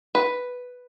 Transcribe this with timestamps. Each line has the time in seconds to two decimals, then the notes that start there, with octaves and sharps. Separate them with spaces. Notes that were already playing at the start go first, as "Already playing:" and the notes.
0.15 B4